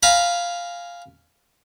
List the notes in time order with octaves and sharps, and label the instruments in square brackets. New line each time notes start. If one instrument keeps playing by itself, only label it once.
[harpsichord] F5 G#5 A#5 B5